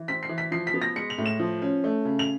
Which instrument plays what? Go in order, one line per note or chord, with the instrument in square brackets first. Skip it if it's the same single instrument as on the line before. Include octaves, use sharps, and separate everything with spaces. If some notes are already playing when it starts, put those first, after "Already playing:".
Already playing: [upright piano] E3
C4 B6
C7
E3
B6
F3 C7
B6
B3
A#6
G#3 C#7
F7
A2
E7
F3
C#4
A3
C#3
F7